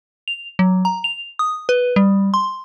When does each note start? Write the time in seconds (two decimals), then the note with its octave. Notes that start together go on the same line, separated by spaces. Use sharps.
0.28 F7
0.59 F#3
0.85 A#5
1.04 F7
1.39 D#6
1.69 B4
1.96 G3
2.34 C6